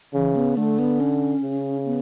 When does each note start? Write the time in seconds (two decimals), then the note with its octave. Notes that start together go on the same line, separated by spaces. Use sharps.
0.14 C#3 E3
0.36 B3
0.57 D3 A3
0.79 B3
1.00 C#4
1.43 C#3
1.86 B3